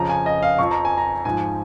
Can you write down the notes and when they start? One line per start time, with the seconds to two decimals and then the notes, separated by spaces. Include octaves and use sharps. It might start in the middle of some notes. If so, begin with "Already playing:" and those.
Already playing: F2 C#3 F3 A#5
0.09 G#5
0.26 D#5
0.42 F5
0.59 F2 F3 C#6
0.71 A#5
0.85 G#5
0.98 A#5
1.25 G#2 F3 G#5